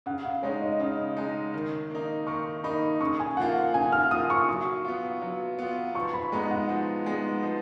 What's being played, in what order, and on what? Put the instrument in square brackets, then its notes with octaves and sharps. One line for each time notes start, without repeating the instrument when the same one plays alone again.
[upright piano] C#3 [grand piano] F#5
[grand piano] F5
[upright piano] G#3 D#4 [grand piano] C#5
[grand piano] D#5
[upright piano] C#3 [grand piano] D#5
[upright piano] G#3 D#4
D#3
A#3 D#4
[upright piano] D#3 [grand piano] C#6
[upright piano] A#3 D#4 [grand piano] B5
[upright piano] C#3 [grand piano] C#6
[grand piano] G#5
[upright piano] F3 A#3 F4 [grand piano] F#5
[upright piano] C#3 [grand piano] G#5
[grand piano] F6
[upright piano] F3 A#3 F4 [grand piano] D#6
[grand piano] C#6
[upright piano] F#3
B3 F4
F#3
B3 F4
[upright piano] F3 [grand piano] C#6
[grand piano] B5
[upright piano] G#3 B3 D#4 [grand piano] A#5
[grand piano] F#5
[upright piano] F3
G#3 B3 D#4
F3